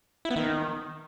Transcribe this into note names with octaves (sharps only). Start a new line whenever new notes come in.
E4
B3
D#3